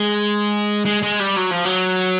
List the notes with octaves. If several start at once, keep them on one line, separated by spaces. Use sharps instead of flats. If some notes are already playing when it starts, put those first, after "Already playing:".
Already playing: G#3
G#3
G#3
G3
F#3
F3
F#3